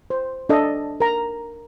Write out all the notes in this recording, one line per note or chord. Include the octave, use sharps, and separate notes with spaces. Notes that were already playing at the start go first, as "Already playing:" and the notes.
C5
D4 A4 D#5
A#4 A#5